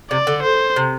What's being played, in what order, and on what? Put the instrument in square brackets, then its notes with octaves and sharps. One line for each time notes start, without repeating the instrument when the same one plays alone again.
[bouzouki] C3 [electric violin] D5
[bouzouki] D3
[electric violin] C5
[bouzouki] C3